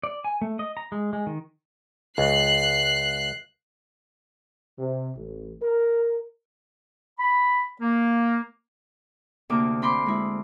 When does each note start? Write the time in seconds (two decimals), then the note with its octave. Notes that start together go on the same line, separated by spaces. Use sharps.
0.03 D5
0.24 G#5
0.42 A3
0.59 D#5
0.77 A#5
0.92 G#3
1.13 G#3
1.27 D#3
2.18 C#2 F#6 C7
4.79 C3
5.17 A1
5.62 A#4
7.19 B5
7.81 A#3
9.50 D2 C3 A#3 D6
9.82 C4 B5 C6 D6
10.06 G#3 E4